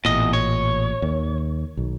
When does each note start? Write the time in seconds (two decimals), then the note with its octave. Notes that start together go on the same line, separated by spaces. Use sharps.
0.05 A1 E2 A#2 D#5
0.33 C#5
1.02 D#2
1.77 B1